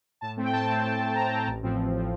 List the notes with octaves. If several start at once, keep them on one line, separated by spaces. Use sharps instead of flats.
A2 A5
A3 C4
G5
A2 A5
A3 C4
A2
A3 C4
A2 A#5
A3 C4
A1
A2 F3 C4
A1
A2 F3 C4